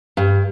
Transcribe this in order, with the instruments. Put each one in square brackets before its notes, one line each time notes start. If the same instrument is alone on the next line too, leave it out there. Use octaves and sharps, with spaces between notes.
[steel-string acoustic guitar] G2